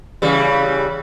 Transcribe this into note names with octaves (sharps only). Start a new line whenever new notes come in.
C#3 E3 G3